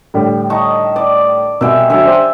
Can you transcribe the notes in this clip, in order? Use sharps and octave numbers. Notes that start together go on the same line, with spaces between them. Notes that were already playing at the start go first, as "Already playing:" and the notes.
A2 D3 G3
D#4 A5 C#6
D5
C2 B2 E5 G5 G#5
D3 F#3 E5 G#5
D4 G4 C5